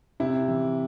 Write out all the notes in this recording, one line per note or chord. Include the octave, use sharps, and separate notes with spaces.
C3 E4
E3